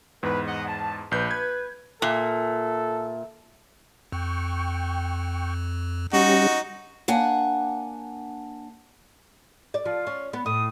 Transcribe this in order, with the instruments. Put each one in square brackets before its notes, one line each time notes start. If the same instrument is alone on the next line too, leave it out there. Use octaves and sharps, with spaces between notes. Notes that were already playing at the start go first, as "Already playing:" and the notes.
[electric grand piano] E2 G#2 [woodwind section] B4
[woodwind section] D#5 F#5
A5
[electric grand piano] A#1 G6 [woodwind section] B4
[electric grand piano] G#6
[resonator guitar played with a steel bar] A#2 [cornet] A4 [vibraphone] E5
[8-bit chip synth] F2 [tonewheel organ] G5 C#6
[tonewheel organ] G3 C#4 G4 [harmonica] D#4 F#4
[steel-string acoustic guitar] A#3 D4 F#5 G#5
[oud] D5
[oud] F3 [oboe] F4
[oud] C#4
B3
[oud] A2 [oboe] D#6